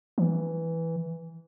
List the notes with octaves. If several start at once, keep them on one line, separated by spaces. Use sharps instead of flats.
E3